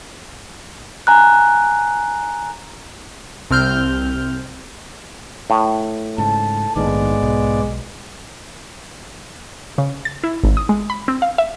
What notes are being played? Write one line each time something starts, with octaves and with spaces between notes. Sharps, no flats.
G#5 A#5 F#6
C2 C4 F6 G6
A2
G#2 C#3 A5
A#1 G#2 D#3 G#3 B3 D5
B1
C#3
A6
E4
G#1
D#6
G#3
B5
C4
F5
E5